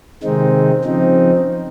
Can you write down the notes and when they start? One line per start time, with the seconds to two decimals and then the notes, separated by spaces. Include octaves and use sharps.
0.23 C3 D#3 G#3 C4 D#4
0.84 C#3 F3 C4 D#4